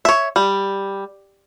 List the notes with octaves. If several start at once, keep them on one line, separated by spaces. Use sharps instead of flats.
C#5 E5
G3